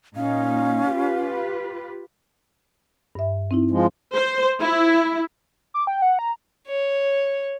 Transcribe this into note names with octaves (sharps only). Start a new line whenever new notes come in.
A#2 C#4 D#4 F5
F4 G4 B4
G2 E5
C4 D#4 E4
F3 G#3
C5
E4
D6
G5
F#5
A#5
C#5